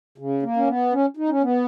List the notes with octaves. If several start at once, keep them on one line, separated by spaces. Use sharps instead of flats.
C#3
A#3
C#4
B3
C#4
D#4
C#4
B3